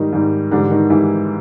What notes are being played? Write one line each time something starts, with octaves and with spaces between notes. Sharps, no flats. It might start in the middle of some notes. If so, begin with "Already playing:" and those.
Already playing: G#2 D#3 G3 D#4
G#2 D#3 G3
G#2 D3 E3 G3 D4
D#3 D#4
G#2 E3 G3 E4